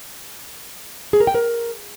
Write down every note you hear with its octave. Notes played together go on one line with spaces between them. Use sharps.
G#4
A#4
G5
A#4